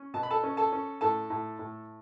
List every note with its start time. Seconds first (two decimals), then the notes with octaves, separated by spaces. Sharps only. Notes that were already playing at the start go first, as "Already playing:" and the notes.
Already playing: C#4
0.14 B2 A5
0.23 B5
0.30 A4 A5
0.43 C#4
0.57 A4 A5
0.72 C#4
1.01 A2 A4 A5
1.30 A2
1.59 A2